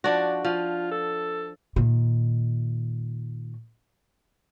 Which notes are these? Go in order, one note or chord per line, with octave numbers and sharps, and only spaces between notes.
F3 D4 F#4 D5
F3 F4
A4
A#2 D#3